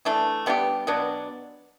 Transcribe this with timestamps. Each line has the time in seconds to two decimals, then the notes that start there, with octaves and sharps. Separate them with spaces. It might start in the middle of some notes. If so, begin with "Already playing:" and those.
0.05 E3 A3 D4
0.46 G3 B3 D4 G4
0.87 B2 F#3 B3 D4